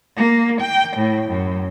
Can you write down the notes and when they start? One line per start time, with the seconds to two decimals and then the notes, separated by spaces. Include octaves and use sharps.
0.17 A#3
0.62 G5
0.97 A2
1.29 F#2